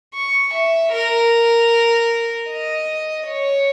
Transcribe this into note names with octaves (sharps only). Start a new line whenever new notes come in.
C#6
E5
A#4
D#5
C#5